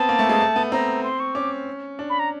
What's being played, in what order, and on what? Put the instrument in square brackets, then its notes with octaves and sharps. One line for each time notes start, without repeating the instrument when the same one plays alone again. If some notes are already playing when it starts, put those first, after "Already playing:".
Already playing: [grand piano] B3 C4 [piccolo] A5
[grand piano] A#3
A3
G#3
A3
B3
[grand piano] C4 [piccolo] A#5
[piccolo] C6
C#6
[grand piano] C#4 [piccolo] D6
[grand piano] D4
[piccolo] B5
A#5